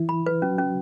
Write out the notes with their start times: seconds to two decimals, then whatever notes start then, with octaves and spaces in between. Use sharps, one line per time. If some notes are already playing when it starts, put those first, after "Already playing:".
Already playing: E3 E4
0.09 B5
0.26 B4
0.42 F#3 C#4 F#4
0.58 C#4